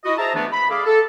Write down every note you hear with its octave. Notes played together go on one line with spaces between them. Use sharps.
E4 F#4 D#5
G#4 C5 E5 A5 A#5
E3 A3 B3 D4
B5
G#4 A4 D5 F5
A4